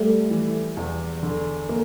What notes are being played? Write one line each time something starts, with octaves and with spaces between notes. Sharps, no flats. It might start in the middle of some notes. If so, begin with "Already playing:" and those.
Already playing: G3 A3
E3
E2
D3
A#3